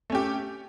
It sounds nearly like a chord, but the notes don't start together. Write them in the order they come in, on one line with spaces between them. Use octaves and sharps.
A3 C#4 G4